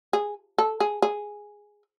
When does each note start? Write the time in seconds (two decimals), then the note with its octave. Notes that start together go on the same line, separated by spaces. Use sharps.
0.13 G#4
0.58 A4
0.80 G#4
1.02 G#4